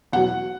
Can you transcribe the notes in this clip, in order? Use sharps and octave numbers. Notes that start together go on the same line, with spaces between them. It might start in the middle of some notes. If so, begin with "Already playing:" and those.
E2 B2 F#3 F#5